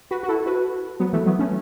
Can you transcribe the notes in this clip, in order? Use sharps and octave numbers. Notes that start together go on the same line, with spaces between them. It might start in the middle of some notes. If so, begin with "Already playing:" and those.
F#4 B4
F#4
E4 A4
F#4 B4
F#3 B3
E3 A3
F#3 B3
A3 C#4